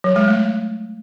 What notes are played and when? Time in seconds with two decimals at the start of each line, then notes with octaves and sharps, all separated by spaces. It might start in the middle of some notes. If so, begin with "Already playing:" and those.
0.04 F#3
0.16 G#3
0.28 A3